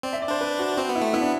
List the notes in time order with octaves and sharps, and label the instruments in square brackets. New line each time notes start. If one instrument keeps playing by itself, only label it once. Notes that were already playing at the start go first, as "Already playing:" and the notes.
[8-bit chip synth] C4 [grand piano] D5
[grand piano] E5
D5
[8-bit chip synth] D4 [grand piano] C5
[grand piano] B4
F#4
[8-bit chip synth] C4 [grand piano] F#4
[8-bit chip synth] B3
[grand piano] E4
[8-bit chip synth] A3
[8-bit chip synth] B3 [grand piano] E4
[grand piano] D4